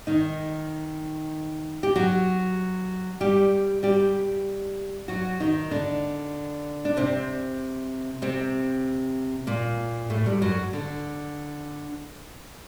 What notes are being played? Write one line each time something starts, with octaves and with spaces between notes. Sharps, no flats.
D#3 D#4
G4
F#3 F#4
G3 G4
G3 G4
F#3 F#4
D#3 D#4
D3 D4
D4
C3 C4
C3 C4
A#2 A#3
A2 A3
G2 G3
F#2 F#3
D3